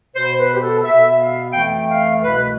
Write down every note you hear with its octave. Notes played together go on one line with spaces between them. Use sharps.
B2 B3 C5
B4
G4
A4
B2 B3 E5
F5
F2 E3 A3 G5
G5
F5
C2 B2 A3 B4